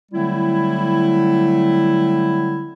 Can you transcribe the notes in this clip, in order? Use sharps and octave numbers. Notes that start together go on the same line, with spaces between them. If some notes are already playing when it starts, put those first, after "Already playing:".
D3 F#3 G3 A3 C4 E4